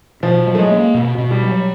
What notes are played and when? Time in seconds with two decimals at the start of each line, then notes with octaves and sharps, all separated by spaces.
0.23 B2 F3
0.47 F#3
0.55 A3
0.59 G#3
0.70 A#3
0.94 B2
1.18 B2
1.31 G3
1.43 F#3